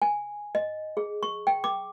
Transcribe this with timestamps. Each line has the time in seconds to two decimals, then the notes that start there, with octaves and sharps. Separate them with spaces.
0.02 G#5
0.55 D#5
0.97 G#4
1.23 C#6
1.47 G5
1.64 D6